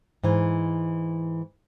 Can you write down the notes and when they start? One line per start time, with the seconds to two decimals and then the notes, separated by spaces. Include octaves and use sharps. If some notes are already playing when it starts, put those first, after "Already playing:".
0.23 G#2 E3